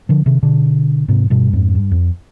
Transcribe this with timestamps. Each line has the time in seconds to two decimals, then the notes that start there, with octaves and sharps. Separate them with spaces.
0.09 D3 F3
0.26 C3 D#3
0.43 B2 D3
1.08 G#2 C3
1.30 G2 B2
1.53 F2 G#2
1.75 G2
1.91 F2